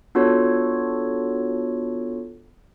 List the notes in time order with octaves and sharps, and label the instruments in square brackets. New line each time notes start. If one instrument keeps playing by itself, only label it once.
[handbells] B3 D4 F4 F#4 A4 C#5